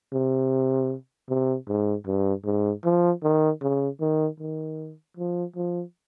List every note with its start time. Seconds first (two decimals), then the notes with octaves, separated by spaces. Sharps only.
0.13 C3
1.29 C3
1.68 G#2
2.06 G2
2.45 G#2
2.84 F3
3.23 D#3
3.62 C#3
4.00 D#3
4.40 D#3
5.17 F3
5.56 F3